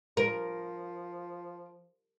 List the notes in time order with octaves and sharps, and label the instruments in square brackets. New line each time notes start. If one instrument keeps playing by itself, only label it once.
[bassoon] F3 [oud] A#4